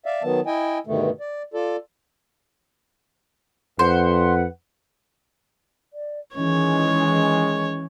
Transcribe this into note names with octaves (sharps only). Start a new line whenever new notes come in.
D5 E5 F5
D#3 F#3 B3 A5
E4 D#5 G5 G#5
G2 B2 D3 D#3 A3
D5
F4 A4 D5
F2 B4 C5 F#5
D5
D#3 E3 G#3 C#4 C#5